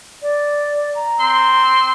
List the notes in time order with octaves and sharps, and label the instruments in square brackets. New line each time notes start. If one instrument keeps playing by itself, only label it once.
[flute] D5
A#5
[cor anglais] C4 [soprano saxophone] C6